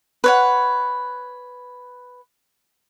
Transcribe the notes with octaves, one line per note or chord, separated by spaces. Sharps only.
B4 C#5 F#5